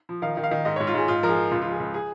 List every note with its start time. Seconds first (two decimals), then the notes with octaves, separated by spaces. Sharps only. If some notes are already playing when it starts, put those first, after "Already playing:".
0.09 F3
0.22 D#3 F5
0.37 D#3
0.44 F5
0.51 D#3
0.65 G#2 D#5
0.76 G#2 C#5
0.87 F4
0.94 G#2 G#4
1.08 G#2 F4
1.23 F3 A#4
1.29 G#4
1.36 F3
1.51 C#2 F4
1.62 F3 F4
1.72 G#4
1.80 C#2
1.94 G#4